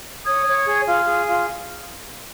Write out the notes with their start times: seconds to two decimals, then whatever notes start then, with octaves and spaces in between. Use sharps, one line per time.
0.24 C#5 D#6 G#6
0.45 C#5
0.65 G#4
0.85 F4
1.05 G#4
1.26 F4